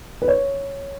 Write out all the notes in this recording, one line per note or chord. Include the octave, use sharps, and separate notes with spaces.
B4
C#5